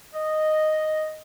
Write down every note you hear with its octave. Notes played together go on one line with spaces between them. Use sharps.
D#5